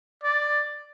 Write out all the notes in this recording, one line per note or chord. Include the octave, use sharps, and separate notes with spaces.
D5